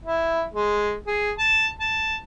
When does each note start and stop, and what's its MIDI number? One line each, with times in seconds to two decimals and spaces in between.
0.05 0.44 64
0.54 0.96 56
1.07 1.32 68
1.39 1.68 81
1.80 2.18 81